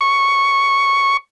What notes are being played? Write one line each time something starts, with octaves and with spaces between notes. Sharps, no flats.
C#6